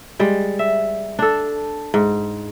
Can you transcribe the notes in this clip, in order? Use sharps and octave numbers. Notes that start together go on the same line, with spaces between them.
G3 G#3
E5
D4 A4
G#2